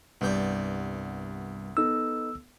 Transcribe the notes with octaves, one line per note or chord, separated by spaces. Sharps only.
C2 G2 B3 D5 G6
B3 D#4 A4 E6